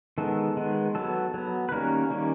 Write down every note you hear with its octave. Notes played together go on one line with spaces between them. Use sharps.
D#3 G#3 B3 A4
D#3 G#3 B3
F#3 B3 A4
F#3 B3
B4
D#3 G3 A#3 C#4 A#4
D#3 G3 A#3 C#4